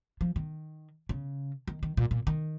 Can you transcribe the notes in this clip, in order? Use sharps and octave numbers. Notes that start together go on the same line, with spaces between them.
F3
D#3
C#3
D#3
D#3
A#2
A#2
D#3